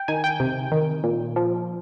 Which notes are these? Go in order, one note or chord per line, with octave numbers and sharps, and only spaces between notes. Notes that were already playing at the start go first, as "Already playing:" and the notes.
Already playing: G5
D#3 G#5
G5
C3
D#3
A#2
F3